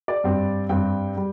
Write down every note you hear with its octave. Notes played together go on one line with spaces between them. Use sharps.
D5
G2 G3 C4
G2 G3 C4 G5
G3